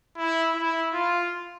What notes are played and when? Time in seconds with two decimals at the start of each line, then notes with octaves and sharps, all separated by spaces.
0.17 E4
0.55 E4
0.93 F4